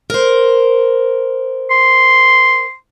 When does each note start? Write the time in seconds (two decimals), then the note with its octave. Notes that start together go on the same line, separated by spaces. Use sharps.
0.10 A#4 C5
1.70 C6